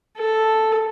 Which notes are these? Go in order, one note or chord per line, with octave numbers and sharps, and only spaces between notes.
A4